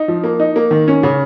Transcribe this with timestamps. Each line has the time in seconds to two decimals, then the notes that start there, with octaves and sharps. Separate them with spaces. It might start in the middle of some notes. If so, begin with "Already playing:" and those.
Already playing: D#4
0.08 F3
0.24 A#3
0.40 D#4
0.56 A#3
0.71 D#3
0.88 C#4
1.03 C#3